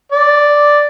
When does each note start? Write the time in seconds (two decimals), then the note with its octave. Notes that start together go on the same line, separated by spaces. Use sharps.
0.12 D5